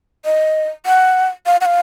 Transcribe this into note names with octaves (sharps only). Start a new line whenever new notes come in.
D#5
F#5
F5
F#5
F5